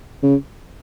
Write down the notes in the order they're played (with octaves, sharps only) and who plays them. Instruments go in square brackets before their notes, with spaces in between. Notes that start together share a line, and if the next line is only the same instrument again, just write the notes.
[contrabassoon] C#3